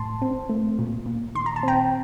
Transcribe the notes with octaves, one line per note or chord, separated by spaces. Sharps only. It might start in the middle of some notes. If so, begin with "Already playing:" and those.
Already playing: A2 A5 C6
C4
A3
A#2
A#2
D#3 C6
A#5
A5
C4 G5 A#5